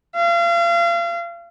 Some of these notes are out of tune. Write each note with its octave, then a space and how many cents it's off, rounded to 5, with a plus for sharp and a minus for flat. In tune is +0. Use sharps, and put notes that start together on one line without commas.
F5 -35